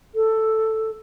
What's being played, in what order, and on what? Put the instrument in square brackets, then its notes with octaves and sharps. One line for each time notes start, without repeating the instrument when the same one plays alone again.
[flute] A4